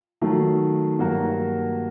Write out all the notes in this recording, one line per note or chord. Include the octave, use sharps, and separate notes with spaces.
D#3 F#3 A3
G2 F#3 A#3 F#4 A#4